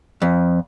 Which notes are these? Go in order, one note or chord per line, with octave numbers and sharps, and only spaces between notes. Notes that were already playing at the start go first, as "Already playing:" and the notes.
F2